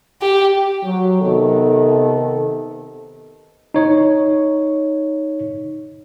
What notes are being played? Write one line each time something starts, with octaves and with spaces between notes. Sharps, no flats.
G4
F#3
C3 D#3 B3 A4
D#4 C#5